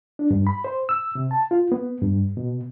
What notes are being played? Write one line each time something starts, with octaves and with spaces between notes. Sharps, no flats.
D4
G2
B5
C5
E6
C3
A5
F4
B3
G2
B2